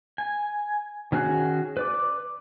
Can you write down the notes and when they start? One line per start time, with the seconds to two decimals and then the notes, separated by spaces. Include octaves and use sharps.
0.18 G#5
1.12 D#3 C#4 F#4 G#4 F#6
1.77 B4 D5 D6